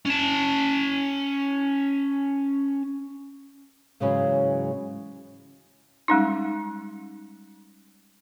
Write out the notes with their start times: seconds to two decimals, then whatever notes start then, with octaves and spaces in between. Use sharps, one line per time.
0.06 C#4 A5
4.00 G#2 C#3 E3 F#3 G#3 C#4
6.08 G3 G#3 C#4 D#4